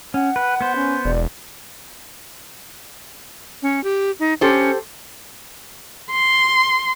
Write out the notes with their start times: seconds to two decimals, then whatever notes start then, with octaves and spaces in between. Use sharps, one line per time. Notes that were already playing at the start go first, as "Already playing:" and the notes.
0.14 C#4 F#5
0.36 B4
0.61 B3 C5
0.76 C#4
1.05 E1 D5
3.62 C#4
3.84 G4
4.20 D#4
4.41 C#4 G4 A4 C5
6.10 C6